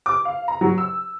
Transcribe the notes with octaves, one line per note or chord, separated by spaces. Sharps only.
D6
F5
A#5
F#3
E6